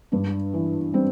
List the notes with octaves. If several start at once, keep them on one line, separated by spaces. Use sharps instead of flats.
G2 D4
E3
G3 C4